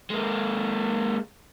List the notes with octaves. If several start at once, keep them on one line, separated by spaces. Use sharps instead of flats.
G#3 A#3